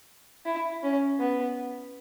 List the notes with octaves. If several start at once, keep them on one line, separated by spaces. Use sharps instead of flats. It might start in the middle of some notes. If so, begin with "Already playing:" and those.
E4
C#4
B3